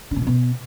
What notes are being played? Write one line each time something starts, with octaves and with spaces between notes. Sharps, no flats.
D3
A#2
F3
B2